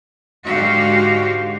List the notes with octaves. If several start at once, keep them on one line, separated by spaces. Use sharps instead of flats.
G#2 D3 F#4 G4 F5